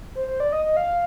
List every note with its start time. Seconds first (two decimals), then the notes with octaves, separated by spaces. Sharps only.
0.15 C5
0.28 C5
0.40 D5
0.52 D#5
0.65 D#5
0.77 F5